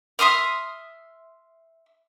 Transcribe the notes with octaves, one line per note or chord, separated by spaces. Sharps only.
E5 C6 D#6 F6